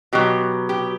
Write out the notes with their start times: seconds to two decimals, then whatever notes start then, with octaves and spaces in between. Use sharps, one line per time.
0.13 B2 F#3 G4
0.69 G4